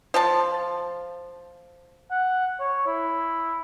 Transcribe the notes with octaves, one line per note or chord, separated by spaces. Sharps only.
F3 F4 A5
F#5
C#5
E4